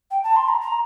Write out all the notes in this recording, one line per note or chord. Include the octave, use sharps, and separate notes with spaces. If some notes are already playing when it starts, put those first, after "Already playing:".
G5
A5
C6
A#5
A#5